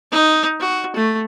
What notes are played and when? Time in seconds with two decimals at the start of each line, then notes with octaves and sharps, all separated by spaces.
0.12 D#4
0.60 F#4
0.96 A3